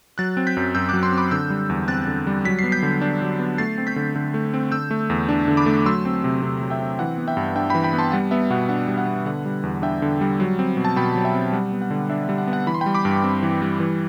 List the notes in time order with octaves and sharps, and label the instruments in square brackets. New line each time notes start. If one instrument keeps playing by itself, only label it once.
[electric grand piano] F#3 F#6 A6
C4
G6 B6
F#2
F#2 E6 G6
D6 F#6
F#3
C6 E6
C4
B5 D6
D3 E6 G6
G3
E2
C4 F#6 A6
D3
G3
F#3 B6
C7
B3
G6 B6
D3
D4
F#3
B3
A3 A6 C7
C4
G6 B6
D3
D3
A3
C4
D3 E6 G6
A3
E2
D4
D3
B5 D6
A3
F#3 C6 E6
C4
C3
C3
F#3
E5 G5
C4
E3 F#5
B3
E5 G5
G2
D4 E5 G5
G5 B5
E3
G5 B5
B3
A5 C6
G3 F#5
B3 E5
B2 F#5
D4 F#5
G3
F#5
B3
D3 F#5
G3
E2
D4 E5 G5
D3
G3
F#3
C4
B2
A5
B2 G5 B5
F#3
E5 G5
C4
G3 F#5
B3
F#5
D3
D4 E5
E5
G3
F#5
B3
F#5
E3 B5
C6
G5 B5
G3
B5 D6
G2
C4
E3
G3
E3